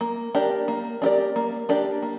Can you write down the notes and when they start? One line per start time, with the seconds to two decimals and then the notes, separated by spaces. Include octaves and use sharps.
0.01 A#3
0.35 D4 G4 A#4 D5
0.68 A#3
1.02 D4 G4 A#4 D5
1.36 A#3
1.69 D4 G4 A#4 D5
2.02 A#3